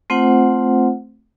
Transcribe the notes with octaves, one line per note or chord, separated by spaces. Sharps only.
A3 C4 F4 C5 F#5